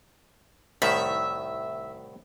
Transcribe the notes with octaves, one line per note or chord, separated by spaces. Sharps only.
C2 A2 D#3 E5